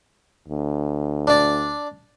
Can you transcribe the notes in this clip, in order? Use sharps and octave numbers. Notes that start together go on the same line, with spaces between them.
D2
D4 D5